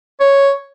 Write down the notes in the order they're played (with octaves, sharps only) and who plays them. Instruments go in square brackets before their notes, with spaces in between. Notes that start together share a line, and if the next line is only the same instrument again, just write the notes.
[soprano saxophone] C#5